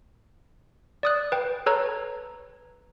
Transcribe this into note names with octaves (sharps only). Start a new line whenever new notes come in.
D5 D#6 F#6
B4 G5
A4 B4 C#5 A#5